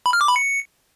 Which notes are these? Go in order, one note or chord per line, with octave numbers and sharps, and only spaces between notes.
B5
F6
D6
B5
C#7